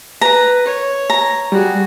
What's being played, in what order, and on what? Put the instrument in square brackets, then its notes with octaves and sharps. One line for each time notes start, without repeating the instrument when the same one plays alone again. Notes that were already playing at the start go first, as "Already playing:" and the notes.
[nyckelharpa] B4 [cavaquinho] A#5
[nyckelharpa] C#5
[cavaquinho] A#5
[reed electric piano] G3 [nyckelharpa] F#4 G#4